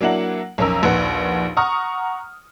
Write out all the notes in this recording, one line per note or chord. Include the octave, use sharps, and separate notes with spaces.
F#3 A#3 D4 E4 F#5 F#7
B1 F2 C#4 A#4 A#5 E6
A#1 D#2 B4 F#5
F#5 A#5 C#6 D#6 F6